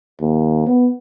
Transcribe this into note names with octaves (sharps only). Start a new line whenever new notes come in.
D#2
B3